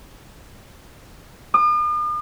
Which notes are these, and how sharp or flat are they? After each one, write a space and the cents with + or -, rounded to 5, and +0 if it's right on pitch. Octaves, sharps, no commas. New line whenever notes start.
D#6 -45